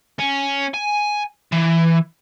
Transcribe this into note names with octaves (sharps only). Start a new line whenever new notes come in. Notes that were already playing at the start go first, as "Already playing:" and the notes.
C#4
G#5
E3